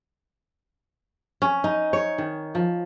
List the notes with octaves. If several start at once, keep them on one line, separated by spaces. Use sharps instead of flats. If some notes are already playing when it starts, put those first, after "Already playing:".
C#4
D#4
C#5
D#3
F3